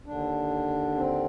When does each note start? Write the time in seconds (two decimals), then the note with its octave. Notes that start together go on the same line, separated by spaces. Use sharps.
0.06 D#2 D3 D4
0.96 C4